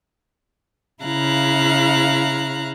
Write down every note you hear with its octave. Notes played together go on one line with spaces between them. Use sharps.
C#3 E4 F5 A#5 F#6